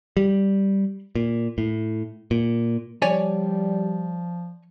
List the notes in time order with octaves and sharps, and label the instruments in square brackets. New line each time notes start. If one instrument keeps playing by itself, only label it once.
[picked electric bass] G3
A#2
A2
A#2
[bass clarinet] F3 [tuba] G3 [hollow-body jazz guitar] C#5 D5 G#5